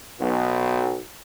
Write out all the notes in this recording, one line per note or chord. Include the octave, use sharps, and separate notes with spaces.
B1 B2